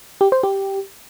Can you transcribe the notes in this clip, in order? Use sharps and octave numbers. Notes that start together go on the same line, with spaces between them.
G4
C5
G4